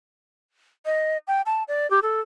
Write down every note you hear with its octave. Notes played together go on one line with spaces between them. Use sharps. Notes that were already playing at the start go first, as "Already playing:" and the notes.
D#5
G5
A5
D5
G4
A4